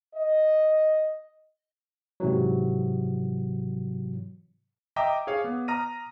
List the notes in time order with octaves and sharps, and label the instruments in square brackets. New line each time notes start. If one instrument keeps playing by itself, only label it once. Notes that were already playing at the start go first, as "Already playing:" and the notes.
[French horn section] D#5
[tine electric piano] G#2 C3 E3 F#3
[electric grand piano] D#5 E5 G5 A#5 D6 D#6
G#4 C#5 F5
B3
A#5 D#6 F6 A#6 D#7